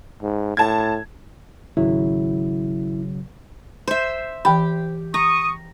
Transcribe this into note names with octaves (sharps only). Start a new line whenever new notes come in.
G#2
A2 A5 G#6
G#1 C#3 F#3 E4
C5 E5
E3 G4 G5 B5
A#5 C#6 D#6